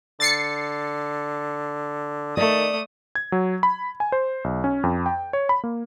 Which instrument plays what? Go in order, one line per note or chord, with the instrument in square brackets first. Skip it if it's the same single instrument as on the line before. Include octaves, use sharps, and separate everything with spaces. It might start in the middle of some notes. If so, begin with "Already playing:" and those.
[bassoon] D3 [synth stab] A6 C7 C#7
[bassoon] D#3 [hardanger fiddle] A3 D#6 [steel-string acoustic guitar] D5
[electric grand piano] G#6
F#3
B5
G#5
C5
B1
C#4
F2
G5
C#5
B5
A#3